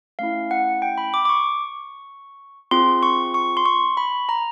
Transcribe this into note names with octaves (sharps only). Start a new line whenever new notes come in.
A3 C#4 E4 F5
F#5
G5
B5
D6
D6
C#6
C4 F4 G#4 C6
C#6
C#6
C6
C#6
B5
A#5